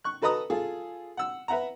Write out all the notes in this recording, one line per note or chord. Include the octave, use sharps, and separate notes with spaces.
C#6 F#6
F#4 A4 B4 D#5 A#5 D#6
F4 G#4 A4
F#5 E6
B4 E5 F#5 A#5